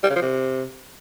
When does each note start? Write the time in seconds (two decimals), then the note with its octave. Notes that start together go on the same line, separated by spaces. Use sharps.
0.04 G3
0.10 C#3
0.16 F3
0.22 C3